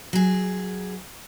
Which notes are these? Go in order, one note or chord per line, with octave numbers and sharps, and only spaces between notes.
F#3 G#4